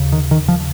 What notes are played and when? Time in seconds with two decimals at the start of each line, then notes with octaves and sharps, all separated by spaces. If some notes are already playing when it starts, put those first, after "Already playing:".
Already playing: D#2 C#3
0.12 D#3
0.31 D#3
0.48 F3